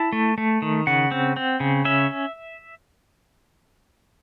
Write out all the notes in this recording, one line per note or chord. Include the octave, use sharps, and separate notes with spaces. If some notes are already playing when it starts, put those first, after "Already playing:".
Already playing: E4 A5
A3
A3
D#3
C#3 F#5
C4
C4
C#3
C#4 E5